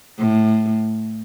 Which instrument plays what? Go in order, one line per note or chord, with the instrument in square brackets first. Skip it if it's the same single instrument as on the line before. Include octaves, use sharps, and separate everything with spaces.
[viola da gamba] A2